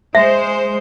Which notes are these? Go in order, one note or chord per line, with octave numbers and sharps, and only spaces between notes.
G#3 C5 E5